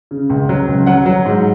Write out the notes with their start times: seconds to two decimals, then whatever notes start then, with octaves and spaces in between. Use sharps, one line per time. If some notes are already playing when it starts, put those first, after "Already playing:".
0.11 C#3
0.30 C#2
0.49 F#3
0.68 C#2
0.86 F#3 F#5
1.06 F#3
1.25 G#2